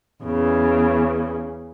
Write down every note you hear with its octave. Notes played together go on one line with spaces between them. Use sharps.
E2 C#3